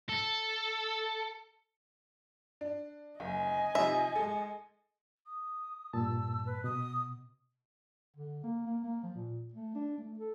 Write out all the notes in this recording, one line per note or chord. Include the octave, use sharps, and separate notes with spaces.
A4
D4
F#1 D#5 G#5
C3 F3 D#4 E5
G#3 A4
D#6
G2 A#2 A5 E6
B4
B2 D#6
D3
A#3
A#3
A#3
F3
A#2
A3
D4
A3
A4